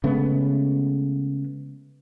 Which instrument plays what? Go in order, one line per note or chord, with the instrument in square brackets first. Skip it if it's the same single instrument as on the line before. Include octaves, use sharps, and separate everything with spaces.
[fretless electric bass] C#3 G#3 A3 B3